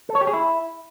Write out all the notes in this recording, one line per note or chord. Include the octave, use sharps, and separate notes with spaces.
A4
C#5
G4
G#4
E4